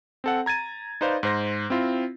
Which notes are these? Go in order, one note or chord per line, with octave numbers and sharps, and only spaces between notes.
C4 A4 F#5
A#5 G#6 A6 D#7
D#4 B4 C5 D5 F5
G#2 C5 A#6
C4 E4 F4